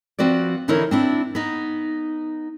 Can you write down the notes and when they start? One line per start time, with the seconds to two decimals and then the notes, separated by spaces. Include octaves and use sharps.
0.19 F3 C4 F#4 B4 D5
0.68 D3 E3 D#4 E4 A#4 C#5
0.91 C4 D4 E4
1.35 B3 D#4